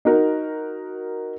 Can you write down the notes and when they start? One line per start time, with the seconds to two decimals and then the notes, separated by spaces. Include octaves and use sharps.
0.05 D#4 F#4 A#4